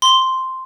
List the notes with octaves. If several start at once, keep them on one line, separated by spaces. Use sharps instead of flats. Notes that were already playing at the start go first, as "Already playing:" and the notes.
C6